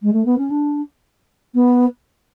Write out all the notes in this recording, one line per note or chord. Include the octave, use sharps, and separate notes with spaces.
G#3
A3
B3
C#4
D4
B3